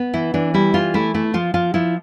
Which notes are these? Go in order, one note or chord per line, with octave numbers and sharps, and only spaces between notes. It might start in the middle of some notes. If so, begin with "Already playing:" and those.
Already playing: B3
E3 E4
E3 D4
G3 E4
E3 F4
A3 E4
A3 E4
F3 F4
F3 F4
F3 E4